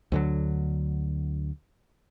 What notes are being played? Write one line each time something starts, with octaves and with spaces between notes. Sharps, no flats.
D2 D3 F#3